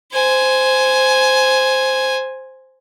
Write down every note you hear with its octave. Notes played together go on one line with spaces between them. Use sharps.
C5 G#5